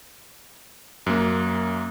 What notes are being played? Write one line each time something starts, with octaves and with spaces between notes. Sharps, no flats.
F#2 A#3